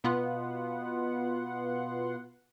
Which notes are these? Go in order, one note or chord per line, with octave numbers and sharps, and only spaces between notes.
B2 B3 F4 F#5 C6